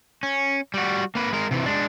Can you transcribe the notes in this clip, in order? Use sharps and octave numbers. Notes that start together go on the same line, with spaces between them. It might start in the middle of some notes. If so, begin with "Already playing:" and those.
C#4
G3 F#4
A#3 B4
G#3 A#4
C3 E3
G#3 D4